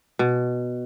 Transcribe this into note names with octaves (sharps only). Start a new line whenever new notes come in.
B2